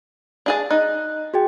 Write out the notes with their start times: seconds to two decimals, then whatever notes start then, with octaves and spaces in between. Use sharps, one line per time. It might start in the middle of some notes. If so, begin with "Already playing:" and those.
0.46 D4 G#4 A5
0.71 D#4 F#6
1.34 F#4 G#4 G5